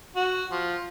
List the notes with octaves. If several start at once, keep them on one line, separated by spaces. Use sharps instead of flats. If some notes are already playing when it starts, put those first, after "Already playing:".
F#4
F3